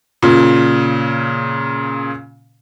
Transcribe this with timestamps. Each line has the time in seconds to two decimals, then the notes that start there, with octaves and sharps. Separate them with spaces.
0.22 A#2 C#3